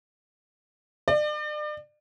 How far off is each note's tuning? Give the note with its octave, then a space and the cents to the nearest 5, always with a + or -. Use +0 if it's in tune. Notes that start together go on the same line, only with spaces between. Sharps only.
D5 +40